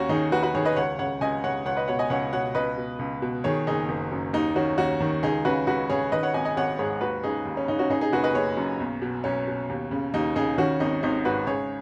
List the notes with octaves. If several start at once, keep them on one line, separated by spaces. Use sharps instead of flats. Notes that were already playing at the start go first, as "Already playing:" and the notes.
Already playing: D#2 C#4 F#4
D#3 D#4 G#4
D#2 F#4 B4
F#4 B4
D#3 G#4 C#5
B4 D#5
C#2 C#5 F#5
C#3 C#5 F#5
C#2 D#5 G#5
C#3 C#5 F#5
C#2 C#5 F#5
B4 D#5
B2 C#5 F#5
D#5 G#5
C#2 C#5 F#5
B2 C#5 F#5
C#2 B4 D#5
B2
C#2
B2
D#3 G#4 C#5
F#1 D#4 G#4
F#1
F#2
D#2 D#4
D#3 C#4 F#4
D#2 C#4 F#4
D#3
C#2 D#4 G#4
C#3 F#4 B4
C#2 F#4 B4
C#3 G#4 C#5
D#3 B4 D#5
C#5 F#5
G#1 D#5 G#5
D#5 G#5
G#1 C#5 F#5
G#2 G#4 C#5
D#2 F#4 B4
C#3 D#4 G#4
D#2
C#4
C#3 D#4
C#4 F#4
C#3 D#4 G#4
D#4 G#4
F#1 F#4 B4
B4 D#5
F#1 G#4 C#5
F#2
B1
B2
B1 C#4
B2
D#2
C#3
D#2 D#4
C#3 D#4 G#4
D#3 C#4 F#4
G#1 D#4
G#1 D#4
G#2 F#4 B4
C#3 G#4 C#5